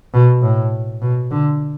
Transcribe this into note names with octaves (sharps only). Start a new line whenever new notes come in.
B2
A2
B2
D3